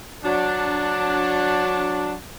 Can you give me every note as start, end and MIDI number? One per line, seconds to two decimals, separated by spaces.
0.24 2.15 54
0.24 2.15 62